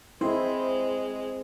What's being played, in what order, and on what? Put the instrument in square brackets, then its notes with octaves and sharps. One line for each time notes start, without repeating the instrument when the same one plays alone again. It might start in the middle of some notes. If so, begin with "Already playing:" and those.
[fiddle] G#3 [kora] C4 [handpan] E4 [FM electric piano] C5